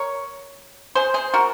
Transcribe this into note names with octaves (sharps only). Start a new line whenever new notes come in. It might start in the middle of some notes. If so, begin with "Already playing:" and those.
Already playing: A#4 C#5
G#4 C5
G#4 C5
F#4 A#4